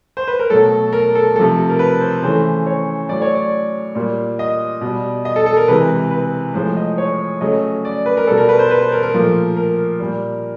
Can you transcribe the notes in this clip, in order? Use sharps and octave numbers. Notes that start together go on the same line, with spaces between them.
C5
B4
A#4
B2 F#3 A3 A4
A#4
A4
C3 F3 A3 A4
A#4
B4
C5
C#3 E3 A3 C5
C#5
A2 F#3 A3 D5
C#5
D5
A#2 G3
D#5
B2 G3
D#5
A4
A4
A#4
C3 E3 G#3 B4
B4
A2 F3 G#3 C5
D#5
C#5
C#3 F#3 A3 D#5
D5
B4
A#4
B2 G3 A4
A#4
B4
C5
B4
C5
A#4
A#4
A#2 F3 A3
A#4
A#2 G3